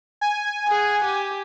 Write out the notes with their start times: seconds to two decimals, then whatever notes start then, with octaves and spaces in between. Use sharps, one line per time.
0.21 G#5
0.68 G#4 F#5
1.04 G4